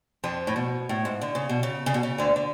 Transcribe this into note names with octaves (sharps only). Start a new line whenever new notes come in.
F2 F3
A2
B2
A2
G#2
D3
C#3
B2
C#3
C#3
B2
C#3
D2 D3
D3